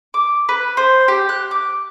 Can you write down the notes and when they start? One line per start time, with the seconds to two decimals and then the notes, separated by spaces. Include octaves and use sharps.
0.14 D6
0.49 B4
0.77 C5
1.08 G4
1.29 F#6
1.51 D6